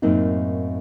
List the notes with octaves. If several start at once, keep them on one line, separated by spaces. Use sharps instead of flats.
F#2 A2 A#3 C4 D#4